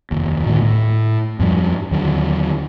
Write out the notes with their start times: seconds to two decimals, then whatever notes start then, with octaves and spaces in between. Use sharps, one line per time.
0.11 F1 D#2
0.46 A2 D3 D#3 A3
0.61 A2 A3
1.39 F2 G#2 F3 G3
1.91 D#2 D3 F#3